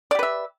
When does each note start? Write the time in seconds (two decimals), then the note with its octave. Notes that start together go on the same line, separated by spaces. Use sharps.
0.11 D5
0.15 G4
0.19 B4
0.23 E5